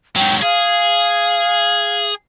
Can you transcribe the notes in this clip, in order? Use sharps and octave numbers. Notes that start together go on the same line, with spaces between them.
G#2 F#3 G5
G#4 F5